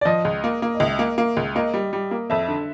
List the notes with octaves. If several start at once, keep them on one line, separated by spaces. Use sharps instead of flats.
D5
F3 D#5
C#2
A#3
A#3
D#5
C#2 E5
A#3
A#3
C#2
A#3 D#5
G3
G3
A#3
F2 E5
D3